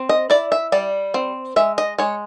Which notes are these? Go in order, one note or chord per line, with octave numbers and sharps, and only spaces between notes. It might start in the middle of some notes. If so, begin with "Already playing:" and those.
Already playing: C4
D#5
E4 D5
E5
G3 D5
C4
G#3 E5
D#5
G#3 C#5